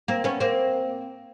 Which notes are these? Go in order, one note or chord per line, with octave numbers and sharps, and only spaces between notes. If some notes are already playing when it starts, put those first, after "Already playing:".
A#3 C4
B3 C#4
A#3 C4